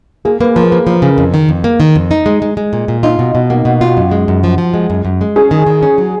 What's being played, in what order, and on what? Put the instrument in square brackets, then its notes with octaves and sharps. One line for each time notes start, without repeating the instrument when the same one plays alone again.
[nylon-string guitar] A#3 [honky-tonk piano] G#4
[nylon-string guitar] A#3 [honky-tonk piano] B4
[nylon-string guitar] F3 [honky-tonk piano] A#4
[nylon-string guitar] A#3 [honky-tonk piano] B4
[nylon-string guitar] F3
C#3
F2
D#3
F2
A#3
D#3
F2
D#4
G#3
G#3
G#3
A#2
A#2
[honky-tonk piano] D#4 [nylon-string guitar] F4
[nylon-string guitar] B2
B2
[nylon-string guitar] A#3 [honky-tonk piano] F#4
[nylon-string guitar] B2
F4
F#2
G#3
F#2
F3
F3
G#3
F#2
F#2
G#3
[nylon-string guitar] C#4 [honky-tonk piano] G#4
[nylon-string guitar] D#3
D#3
C#4
F#3